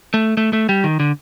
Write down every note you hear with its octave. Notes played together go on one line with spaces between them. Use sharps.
A3
A3
A3
G3
D#3
D3